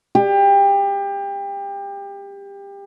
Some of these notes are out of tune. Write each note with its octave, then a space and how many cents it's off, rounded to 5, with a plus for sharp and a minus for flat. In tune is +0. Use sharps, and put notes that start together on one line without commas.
G4 +25